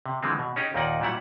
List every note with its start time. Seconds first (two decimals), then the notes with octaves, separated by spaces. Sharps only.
0.06 C3
0.23 D3 E3 F3 G#3 C4
0.39 B2
0.56 C#4 D#4 G4 G#4
0.74 D#2 A#2 A#3 D#4 D5 F#5
1.00 A#2 F#3 G3 E4 F#5